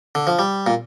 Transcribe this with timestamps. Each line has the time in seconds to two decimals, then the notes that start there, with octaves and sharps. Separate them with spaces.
0.15 D3
0.27 F3
0.39 G3
0.67 A#2